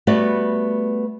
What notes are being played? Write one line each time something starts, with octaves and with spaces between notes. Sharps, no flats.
G3 A3 B3 F#4 B4 D5